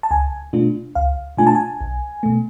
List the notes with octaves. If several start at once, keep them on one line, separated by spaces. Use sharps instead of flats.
A5
C#2 G#5
B2 A3 D4 F4
C#2 F5
B2 A3 D4 F4 G#5
A5
G#5
B1
B2 A3